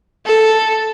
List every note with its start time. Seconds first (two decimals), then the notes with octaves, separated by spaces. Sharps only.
0.25 A4